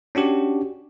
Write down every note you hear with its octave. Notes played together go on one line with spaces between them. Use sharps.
C#4 D4 F#4 G4